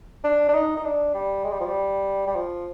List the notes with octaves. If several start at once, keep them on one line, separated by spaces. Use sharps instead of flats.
D4
D4
D#4
D#4
D4
G3
G#3
G3
F3
G3
G3
F3